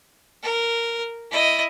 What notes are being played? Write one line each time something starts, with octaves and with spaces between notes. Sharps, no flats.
A#4
E4 D#5